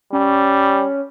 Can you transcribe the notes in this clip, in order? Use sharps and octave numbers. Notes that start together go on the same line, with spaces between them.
G3 C#4